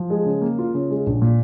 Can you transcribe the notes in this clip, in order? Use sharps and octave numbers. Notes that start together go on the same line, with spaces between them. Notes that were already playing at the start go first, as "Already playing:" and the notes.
Already playing: F3
G#3
C#3
A#3
F4
C#3
G#3
A#1
A#2